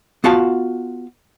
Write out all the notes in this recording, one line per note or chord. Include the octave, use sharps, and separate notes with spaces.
B3 F4 F#4 F5 A5